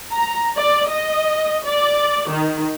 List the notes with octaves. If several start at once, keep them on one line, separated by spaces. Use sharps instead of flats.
A#5
D5
D#5
D5
D#3